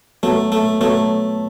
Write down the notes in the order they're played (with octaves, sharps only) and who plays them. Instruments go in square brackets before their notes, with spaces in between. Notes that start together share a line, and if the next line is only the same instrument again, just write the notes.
[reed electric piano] F#3 B3 A4 C#5 [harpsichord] A3
[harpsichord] A3
[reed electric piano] F#3 B3 A4 C#5 [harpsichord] A3